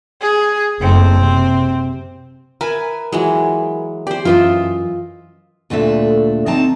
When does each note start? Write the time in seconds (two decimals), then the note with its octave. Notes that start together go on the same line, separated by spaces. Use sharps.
0.21 G#4
0.81 F#1 A3 C4
1.17 C3
2.61 A#4 B4 E5 G#5
3.12 E3 F#3 G#3
4.07 G4 C5 D5
4.25 F#2 E3 F4 D#5 E5
5.70 D2 A#2 A3 D4 E5
6.46 D2 C4 D#4 A5 A#5